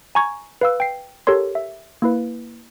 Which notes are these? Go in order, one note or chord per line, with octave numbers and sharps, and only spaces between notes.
G#5 A#5 C#6 G#6
B4 F5 E6
G5 C7
G4 A4 A#4 C#5 C6
E5
A#3 E4 B4